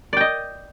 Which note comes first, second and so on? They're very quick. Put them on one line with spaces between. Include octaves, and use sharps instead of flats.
D5 G5 D#5